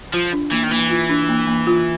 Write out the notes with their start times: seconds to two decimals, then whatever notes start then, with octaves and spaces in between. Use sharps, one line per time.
0.13 F3 F4
0.33 D4
0.51 E3 A#3
0.63 D#3
0.71 E3 A#3
0.90 F4
1.10 D4
1.29 A#3
1.48 A#3
1.67 F4